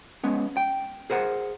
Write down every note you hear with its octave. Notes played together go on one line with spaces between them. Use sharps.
G#3 B3 C#4
G5
G#4 A#4 C5 F#5